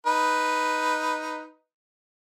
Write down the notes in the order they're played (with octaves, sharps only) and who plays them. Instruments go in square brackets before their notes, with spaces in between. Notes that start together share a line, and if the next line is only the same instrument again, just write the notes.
[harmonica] D#4 B4